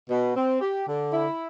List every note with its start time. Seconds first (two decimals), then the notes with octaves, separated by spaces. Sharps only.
0.10 B2
0.36 C4
0.61 G4
0.87 D3
1.12 E4